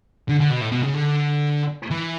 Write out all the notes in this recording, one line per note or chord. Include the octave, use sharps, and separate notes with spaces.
D3
D3
B2
A2
B2
C#3
D3
E3